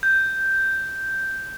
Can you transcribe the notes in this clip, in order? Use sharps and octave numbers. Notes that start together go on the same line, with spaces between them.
G6